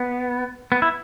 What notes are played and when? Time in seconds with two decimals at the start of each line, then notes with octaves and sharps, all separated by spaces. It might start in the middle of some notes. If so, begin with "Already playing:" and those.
Already playing: B3
0.72 B3
0.82 E4